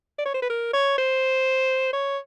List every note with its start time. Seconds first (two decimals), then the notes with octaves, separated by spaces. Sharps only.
0.19 D5
0.25 C#5
0.34 C5
0.42 B4
0.50 A#4
0.73 C#5
0.98 C5
1.93 C#5